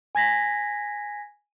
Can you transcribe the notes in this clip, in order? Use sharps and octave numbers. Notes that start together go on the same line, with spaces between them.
G#5 G#6 A#6 B6